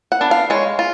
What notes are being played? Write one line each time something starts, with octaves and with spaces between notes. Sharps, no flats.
F#5
B3 D4
F5
G#3 C#5
F4